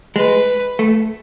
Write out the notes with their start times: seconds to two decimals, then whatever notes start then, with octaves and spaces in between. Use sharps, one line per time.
0.16 G#3 B4
0.79 A3